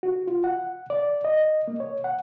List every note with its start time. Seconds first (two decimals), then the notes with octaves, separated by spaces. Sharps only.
0.03 F#4
0.27 F4
0.44 F#5
0.90 D5
1.25 D#5
1.68 A#3
1.80 C#5
2.04 F#5